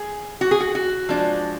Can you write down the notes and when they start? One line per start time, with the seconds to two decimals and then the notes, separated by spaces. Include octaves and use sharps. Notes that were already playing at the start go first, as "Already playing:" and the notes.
Already playing: G#4
0.41 F#4
0.51 G#4
0.60 F#4
0.75 F#4
1.09 F3 G#3 D4